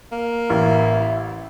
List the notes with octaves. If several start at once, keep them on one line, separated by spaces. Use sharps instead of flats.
A#3
A1 E4